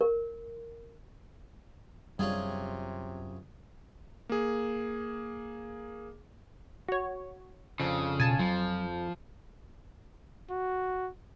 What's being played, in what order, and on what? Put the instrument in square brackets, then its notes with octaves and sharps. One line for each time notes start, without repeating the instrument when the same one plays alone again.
[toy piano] A#4
[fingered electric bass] F#2 [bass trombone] C3 [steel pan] G3 [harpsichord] C#4 F4 G#4
[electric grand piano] A#3 G#4
[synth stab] F#4 C#5
[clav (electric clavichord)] F2 C4 D4 [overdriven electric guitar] C#3
[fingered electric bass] B2 [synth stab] G#5 A5
[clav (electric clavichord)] F2 [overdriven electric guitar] F3 [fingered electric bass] F#3
[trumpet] F#4